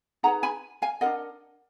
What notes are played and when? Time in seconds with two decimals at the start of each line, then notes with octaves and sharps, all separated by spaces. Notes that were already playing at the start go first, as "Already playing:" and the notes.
0.23 D#4 G#4 B4 F#5 A#5
0.43 G#5 B5
0.82 F5 G#5
1.01 D4 F4 A#4 D#5 F#5